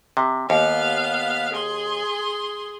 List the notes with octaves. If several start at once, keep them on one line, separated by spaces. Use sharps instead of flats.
C3
D#2 B3 F5
G#4 C6